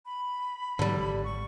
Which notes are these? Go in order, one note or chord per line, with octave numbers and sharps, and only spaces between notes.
B5
G#2 D3 E3 F#3 G3
G#1
C#6